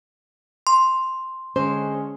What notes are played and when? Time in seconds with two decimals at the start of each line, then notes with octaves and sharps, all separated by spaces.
0.67 C6
1.56 D3 G#3 C#4 C5